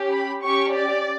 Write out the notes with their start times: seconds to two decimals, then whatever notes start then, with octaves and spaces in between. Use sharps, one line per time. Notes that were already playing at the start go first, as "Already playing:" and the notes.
Already playing: C#4 G4
0.09 B5
0.42 C#4 G4 C#6
0.75 D5